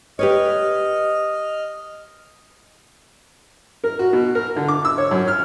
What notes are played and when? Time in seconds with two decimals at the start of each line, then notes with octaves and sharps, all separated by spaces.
0.19 G4 B4 C#5 D#5 F6
3.84 A#4
3.99 F#4
4.13 B2
4.35 A#4
4.56 D3
4.68 D6
4.85 E6
4.98 C#5
5.11 F#2
5.28 F6